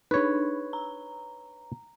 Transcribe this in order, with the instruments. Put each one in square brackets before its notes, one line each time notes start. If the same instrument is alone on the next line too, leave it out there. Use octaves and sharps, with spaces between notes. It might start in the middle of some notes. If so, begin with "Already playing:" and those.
[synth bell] D4 D#4 [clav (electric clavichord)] B4 C#5
[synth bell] A#5